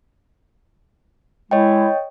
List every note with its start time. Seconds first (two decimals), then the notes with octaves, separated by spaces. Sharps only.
1.51 G#3 E4 C#5 D#5 G5